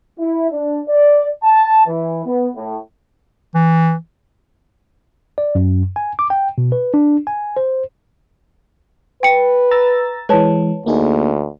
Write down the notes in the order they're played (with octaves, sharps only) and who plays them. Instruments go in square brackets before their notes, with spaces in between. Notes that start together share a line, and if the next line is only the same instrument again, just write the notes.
[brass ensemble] E4
D4
D5
A5
E3
B3
A2
[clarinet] E3
[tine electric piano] D5
F#2
G#5
D6
G5
B2
B4
D4
G#5
C5
[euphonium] B4 [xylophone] G5 C#7
[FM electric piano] A#5 E6 A6
[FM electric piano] E3 G#3 [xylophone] B4 C#5 A5
[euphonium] D2 [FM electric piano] A#3 D#4 G#4